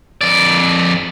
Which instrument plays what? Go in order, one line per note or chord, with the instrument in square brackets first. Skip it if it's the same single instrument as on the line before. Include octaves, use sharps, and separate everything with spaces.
[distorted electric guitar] F2 D5